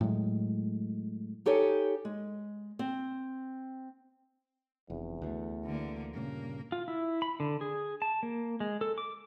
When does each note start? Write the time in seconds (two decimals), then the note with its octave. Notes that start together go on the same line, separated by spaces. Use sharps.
0.01 A2 F#3 G#3
1.46 D#4 G4 A4 C#5 G#5
2.05 G#3
2.79 C4
4.90 F1 E2
5.22 D2 E3 A3
5.66 D3 A#3
6.14 G2 A#2 C#3 A#3
6.72 F4
6.88 E4
7.22 B5
7.40 D3
7.61 G#4
8.02 A5
8.23 A#3
8.60 G#3
8.81 A4
8.98 D6